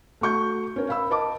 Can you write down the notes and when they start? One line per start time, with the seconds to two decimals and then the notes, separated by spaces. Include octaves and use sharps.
0.21 A3 F#4 C#6 G6
0.76 C#4 A#4
0.89 F5 B5 E6
1.10 A#4 D#5 A5 D6